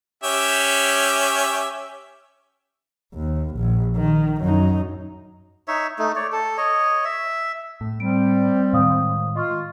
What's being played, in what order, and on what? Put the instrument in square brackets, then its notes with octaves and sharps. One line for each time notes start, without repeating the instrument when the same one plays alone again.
[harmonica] C#4 G4 E5
[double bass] D#2
A#1
D#3
F#2 D#4
[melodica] D#4 C#5 E5
A3 D#4
C#5 D5
A4
C#5 D#5
E5
[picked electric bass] A2
[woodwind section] G3 [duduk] C4 [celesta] D7
[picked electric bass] A2 D#3 G#3 [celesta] F5 D#6
[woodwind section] F4 [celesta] D#5 C#6 F6